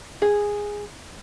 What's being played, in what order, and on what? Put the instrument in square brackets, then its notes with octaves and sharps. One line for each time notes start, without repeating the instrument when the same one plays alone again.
[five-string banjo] G#4